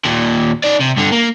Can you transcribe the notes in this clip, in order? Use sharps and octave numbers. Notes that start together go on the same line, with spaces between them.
D#2 A#2
D#4 D5
C3
G2 D3
A#3